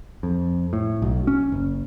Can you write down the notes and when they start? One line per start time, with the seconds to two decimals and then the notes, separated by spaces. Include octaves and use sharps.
0.23 F2
0.73 A2
1.02 B1
1.27 C#4
1.52 F#1